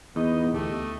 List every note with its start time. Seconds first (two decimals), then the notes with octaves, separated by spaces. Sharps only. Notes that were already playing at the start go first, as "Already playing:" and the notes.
0.16 E2 B3 D#4 D#5
0.53 D2 A3 G4 D#5